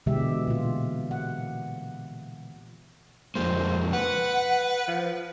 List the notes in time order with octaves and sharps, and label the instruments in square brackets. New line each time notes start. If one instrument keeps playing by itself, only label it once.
[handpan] B2 D3 E3 G#3 G4 E5
A#2 F4
F#5
[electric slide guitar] F2 G#3 A#3 [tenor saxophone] C5
[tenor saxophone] B4 [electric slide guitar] F#5
[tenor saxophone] F3